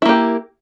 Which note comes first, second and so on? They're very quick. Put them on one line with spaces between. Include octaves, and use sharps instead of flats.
E4 A#3 G4